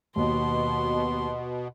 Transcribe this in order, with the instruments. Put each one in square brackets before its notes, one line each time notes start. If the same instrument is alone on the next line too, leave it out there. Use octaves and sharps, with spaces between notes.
[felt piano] D#2 [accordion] B2 [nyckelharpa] C6